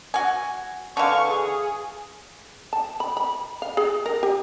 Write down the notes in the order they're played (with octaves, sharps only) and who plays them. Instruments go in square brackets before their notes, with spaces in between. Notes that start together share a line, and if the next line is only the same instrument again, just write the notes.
[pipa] F#4 G#5
[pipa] D3 E3 [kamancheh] F5 C#6
[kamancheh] G#4
[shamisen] A5
B5
B5
F5
G#4
A#4
G4